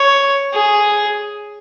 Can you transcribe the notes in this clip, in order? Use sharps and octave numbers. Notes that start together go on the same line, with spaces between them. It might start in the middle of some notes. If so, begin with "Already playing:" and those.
Already playing: C#5
G#4